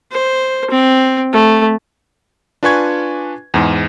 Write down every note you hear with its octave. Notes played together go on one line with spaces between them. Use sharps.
C5
C4
A3
D4 F4 B4 G#5 C#6 G#6
E2 G#2